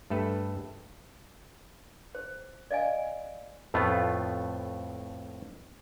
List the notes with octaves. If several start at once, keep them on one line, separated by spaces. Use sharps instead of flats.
G2 A3 A4 B4
C5
D5 D#5 F5 G#5
F2 A2 A3 B3 F4